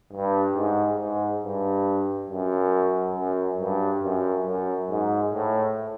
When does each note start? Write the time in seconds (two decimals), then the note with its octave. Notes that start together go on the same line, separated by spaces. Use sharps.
0.13 G2
0.56 G#2
0.99 G#2
1.42 G2
2.30 F#2
3.16 F#2
3.60 G2
4.03 F#2
4.46 F#2
4.90 G#2
5.33 A2